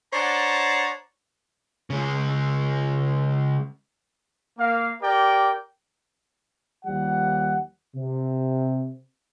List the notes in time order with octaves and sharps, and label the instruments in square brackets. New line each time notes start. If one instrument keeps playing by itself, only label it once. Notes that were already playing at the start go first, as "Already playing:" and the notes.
[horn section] D4 C5 C#5 F#5 A5 A#5
[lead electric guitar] C#3 G#3
[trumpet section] A#3 F5
G4 A#4 D5 G5
[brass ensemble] D#2 F3 G3 F#5
C3